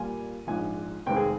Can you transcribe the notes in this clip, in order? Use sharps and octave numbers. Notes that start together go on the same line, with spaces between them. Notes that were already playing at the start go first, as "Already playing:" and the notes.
Already playing: A#2 G3 A#3 F4 G#5
A#1 G#2 F3 G#5
F1 D#2 D#3 G#3 C4 G5
G#4